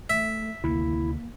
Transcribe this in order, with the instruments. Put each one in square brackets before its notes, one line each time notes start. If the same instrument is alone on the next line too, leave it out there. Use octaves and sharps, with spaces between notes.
[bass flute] A3 [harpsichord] E5
[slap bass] D2 C3 D#3 [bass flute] A#3 [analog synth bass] E4